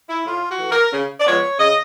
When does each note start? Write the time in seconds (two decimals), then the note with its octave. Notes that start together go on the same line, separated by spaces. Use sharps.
0.09 E4
0.26 A2 F4
0.49 F#4
0.59 E3 A3
0.70 A#4
0.92 C#3
1.20 D5
1.27 F3 G#3 B3 C#5
1.59 C#3 D#5